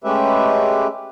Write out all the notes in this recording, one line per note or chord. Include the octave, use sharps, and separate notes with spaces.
G#3 A3 C#4 G4 B4 E5